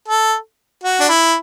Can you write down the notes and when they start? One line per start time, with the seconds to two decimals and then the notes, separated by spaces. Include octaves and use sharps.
0.08 A4
0.84 F#4
1.00 D4
1.09 E4